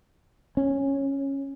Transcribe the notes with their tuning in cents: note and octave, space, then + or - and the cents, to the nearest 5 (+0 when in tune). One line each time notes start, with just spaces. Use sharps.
C#4 -10